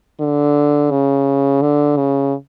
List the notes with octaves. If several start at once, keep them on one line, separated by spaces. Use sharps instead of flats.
D3
C#3
D3
C#3